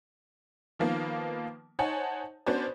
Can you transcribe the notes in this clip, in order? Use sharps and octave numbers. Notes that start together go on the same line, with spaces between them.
D#3 F3 A#3 B3
D#4 C5 C#5 F#5 G#5 A5
B3 C#4 D4 F#4 C5 D5